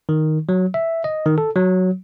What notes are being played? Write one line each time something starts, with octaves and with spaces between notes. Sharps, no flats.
D#3
F#3
E5
D#5
D#3
A4
F#3